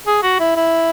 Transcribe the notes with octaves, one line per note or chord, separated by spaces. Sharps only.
G#4
F#4
E4
E4